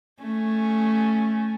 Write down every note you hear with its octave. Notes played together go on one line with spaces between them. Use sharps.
A3 C#4